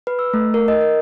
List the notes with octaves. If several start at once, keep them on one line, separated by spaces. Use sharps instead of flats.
B4
E6
A3
A#4
D#5
A#4